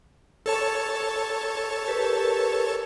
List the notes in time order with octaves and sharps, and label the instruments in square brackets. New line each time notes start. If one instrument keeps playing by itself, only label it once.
[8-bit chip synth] A4 C#5 A5
[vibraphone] G4 A#4 B4